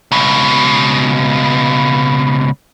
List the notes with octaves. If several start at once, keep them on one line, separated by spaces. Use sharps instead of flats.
C#2 B2